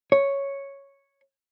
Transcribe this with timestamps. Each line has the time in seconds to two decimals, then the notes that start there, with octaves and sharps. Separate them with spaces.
0.12 C#5